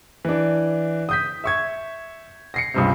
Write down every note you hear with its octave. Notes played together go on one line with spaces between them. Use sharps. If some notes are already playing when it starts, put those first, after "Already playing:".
E3 D4
D#6 G6 B6
E5 C#6 G#6
A#6 C7 C#7
C#2 G2 C3